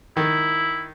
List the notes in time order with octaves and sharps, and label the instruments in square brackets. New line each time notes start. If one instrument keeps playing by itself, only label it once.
[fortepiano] D#3 [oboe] E4